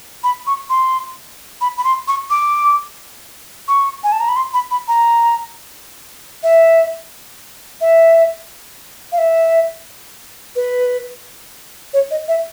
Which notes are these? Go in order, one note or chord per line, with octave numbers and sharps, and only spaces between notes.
B5
C#6
C6
B5
B5
C6
C#6
D6
C#6
G#5
A5
A#5
B5
C6
B5
B5
A#5
E5
E5
F5
E5
B4
C#5
D#5
E5